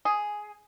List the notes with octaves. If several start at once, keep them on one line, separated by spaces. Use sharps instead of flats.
G#4